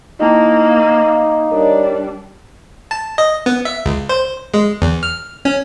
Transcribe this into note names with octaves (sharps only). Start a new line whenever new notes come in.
A#3 D#4 E4 G5 A5
F5 D6 C7
G3 D4 A#4 C#5 D#5
A5
D#5
B3
E5
C#2
C5
G#3
E2
F6
C#4